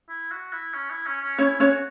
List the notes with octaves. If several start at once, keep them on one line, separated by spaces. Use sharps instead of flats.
E4
F#4
E4
C#4
E4
C#4
C#4
C#4 E4 C#5
C#4 F#4 C#5